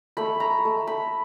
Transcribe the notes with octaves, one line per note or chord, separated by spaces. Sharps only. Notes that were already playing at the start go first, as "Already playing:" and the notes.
A3 B5
A#5
A3
B5